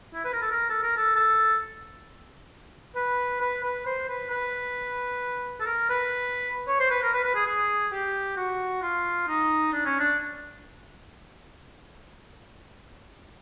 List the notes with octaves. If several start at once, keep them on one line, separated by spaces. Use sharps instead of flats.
E4
B4
A#4
A4
A#4
A4
A#4
A4
A4
B4
B4
B4
C5
B4
B4
A4
A#4
B4
C#5
C5
B4
A#4
B4
B4
G#4
G#4
G4
F#4
F4
D#4
D4
C#4
D4